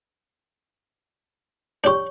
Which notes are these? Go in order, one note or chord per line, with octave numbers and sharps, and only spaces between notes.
D4 G4 C#5 C#6